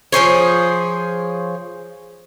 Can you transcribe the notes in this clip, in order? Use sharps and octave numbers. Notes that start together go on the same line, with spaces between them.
F3 G#4 C5 C#5